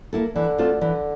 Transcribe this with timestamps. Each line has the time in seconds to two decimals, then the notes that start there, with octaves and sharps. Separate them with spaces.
0.13 A#3 E4 A4
0.35 D3 E3
0.58 A3 C4 F4 A4
0.81 D3 E3